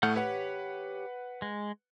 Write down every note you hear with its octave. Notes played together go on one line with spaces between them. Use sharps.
A2 A3 F#5 F6 G6
G4 B4 C#5 F#5
G#3